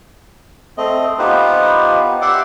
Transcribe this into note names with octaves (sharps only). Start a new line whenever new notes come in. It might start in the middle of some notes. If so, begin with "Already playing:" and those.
A3 C4 D#5
B3 D#4 F4 G4 B4 C5
G4 D5 E5 F#5 C6 D6